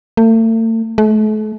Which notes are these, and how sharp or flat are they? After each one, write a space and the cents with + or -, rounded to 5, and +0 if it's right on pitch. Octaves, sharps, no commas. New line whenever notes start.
A3 +40
A3 -40